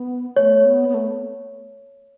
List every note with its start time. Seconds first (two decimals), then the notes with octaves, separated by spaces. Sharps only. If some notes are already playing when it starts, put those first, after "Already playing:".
Already playing: B3
0.36 A3 C#5
0.65 B3
0.89 B3
0.94 A3